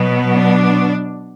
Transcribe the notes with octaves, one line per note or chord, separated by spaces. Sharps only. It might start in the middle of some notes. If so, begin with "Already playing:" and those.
Already playing: B2 F#3 B3
D4